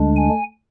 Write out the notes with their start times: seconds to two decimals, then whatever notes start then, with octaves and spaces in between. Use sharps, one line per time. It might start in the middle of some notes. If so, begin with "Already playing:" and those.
Already playing: D2 D3 G#3 D4
0.16 G#5